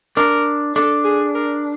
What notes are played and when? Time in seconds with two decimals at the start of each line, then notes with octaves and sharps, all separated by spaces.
0.17 D4 A#4
0.75 D4 A4
1.05 G#4
1.35 A#4